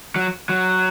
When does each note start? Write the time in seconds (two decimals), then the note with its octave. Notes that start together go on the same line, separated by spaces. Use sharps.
0.16 F#3
0.49 F#3